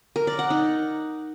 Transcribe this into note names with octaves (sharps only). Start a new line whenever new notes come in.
A#4
D5
F#5
D#4